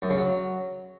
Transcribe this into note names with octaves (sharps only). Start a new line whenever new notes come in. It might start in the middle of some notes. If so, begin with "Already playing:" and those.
F#2
C#3
F#3